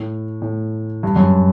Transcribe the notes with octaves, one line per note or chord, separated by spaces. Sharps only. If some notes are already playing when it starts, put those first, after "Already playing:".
Already playing: A2
A2
G2
F#2